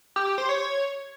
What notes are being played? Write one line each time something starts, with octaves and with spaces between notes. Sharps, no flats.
G4
G4
C5
C#5